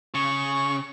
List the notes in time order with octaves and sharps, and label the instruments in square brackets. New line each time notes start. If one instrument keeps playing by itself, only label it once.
[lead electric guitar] C#3 [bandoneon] C#6